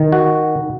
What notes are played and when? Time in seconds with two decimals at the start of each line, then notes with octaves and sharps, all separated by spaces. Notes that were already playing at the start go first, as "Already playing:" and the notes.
Already playing: D#3
0.12 F#4